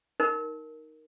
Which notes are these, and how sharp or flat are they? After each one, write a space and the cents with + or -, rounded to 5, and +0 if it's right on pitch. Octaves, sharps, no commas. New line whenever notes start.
D#4 +0 A#4 +0